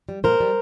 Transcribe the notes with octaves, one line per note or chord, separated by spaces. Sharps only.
G3
A#2 A#4 C5
G3